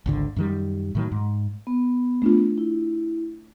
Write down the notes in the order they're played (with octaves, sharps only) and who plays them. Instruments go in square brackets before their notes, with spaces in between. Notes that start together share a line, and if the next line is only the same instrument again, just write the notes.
[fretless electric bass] G#1 C#2 D3
F#2 D#3 G3
A2 D#3 F#3
G#2
[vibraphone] B3
[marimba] A3 D4 F4
[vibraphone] E4